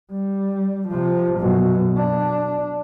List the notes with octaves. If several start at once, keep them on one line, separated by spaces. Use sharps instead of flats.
G3
C3 F3
F#2 B2
D4